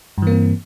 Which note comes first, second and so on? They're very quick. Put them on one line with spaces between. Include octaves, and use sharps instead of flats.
G2 E3 A#3 C4